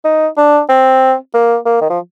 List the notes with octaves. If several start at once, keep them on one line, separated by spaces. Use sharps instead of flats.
D#4
D4
C4
A#3
A#3
D#3
F3